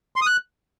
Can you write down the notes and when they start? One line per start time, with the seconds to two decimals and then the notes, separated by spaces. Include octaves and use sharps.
0.16 C6
0.21 D#6
0.27 F#6